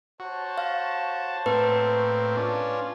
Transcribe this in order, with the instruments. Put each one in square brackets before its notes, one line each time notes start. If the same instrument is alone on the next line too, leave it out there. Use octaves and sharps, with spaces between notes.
[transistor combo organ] F#4 [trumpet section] C5 C#5 A5
[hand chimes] F5
[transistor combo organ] A2 A#3 C4 [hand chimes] B4
[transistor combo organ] C#4 D4 [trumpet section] F4